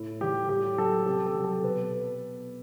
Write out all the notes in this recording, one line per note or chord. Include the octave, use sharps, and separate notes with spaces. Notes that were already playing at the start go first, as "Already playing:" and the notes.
Already playing: A2 E4
E3 G3 G4
A2 G4
F#3 A4
C3 G4
A4
F#3
A4
B2 B4